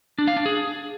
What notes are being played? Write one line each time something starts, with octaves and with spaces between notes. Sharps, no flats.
D4
F5
D4
G#4